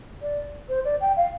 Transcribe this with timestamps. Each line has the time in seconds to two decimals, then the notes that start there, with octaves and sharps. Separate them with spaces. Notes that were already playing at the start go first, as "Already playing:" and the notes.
0.22 D5
0.69 C5
0.85 D5
1.01 G5
1.16 F5